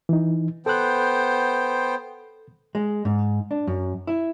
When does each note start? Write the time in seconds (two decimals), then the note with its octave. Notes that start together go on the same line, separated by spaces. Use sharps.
0.09 E3 D#4
0.66 B3 A4 C5 G5 F#6
2.75 G#3
3.05 G#2
3.51 D4
3.67 F#2
4.07 E4